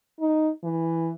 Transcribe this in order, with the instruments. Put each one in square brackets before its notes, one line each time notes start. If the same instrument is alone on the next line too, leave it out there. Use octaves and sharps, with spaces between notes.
[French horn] D#4
E3